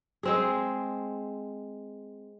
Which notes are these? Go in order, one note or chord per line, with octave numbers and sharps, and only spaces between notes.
G#3 C4 G#4